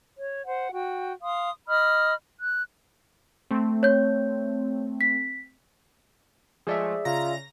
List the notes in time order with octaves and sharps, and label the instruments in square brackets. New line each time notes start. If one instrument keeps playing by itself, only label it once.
[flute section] C#5
C5 F#5
F#4 G5
F5 C6 D#6
D#5 B5 D#6 F6
F#6
[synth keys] A3 C4
[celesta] C#5 G6
B6
[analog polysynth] F3 G#3 A3 [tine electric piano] G#4 D5 E5
[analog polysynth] C#3 A#5 A#6 [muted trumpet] F4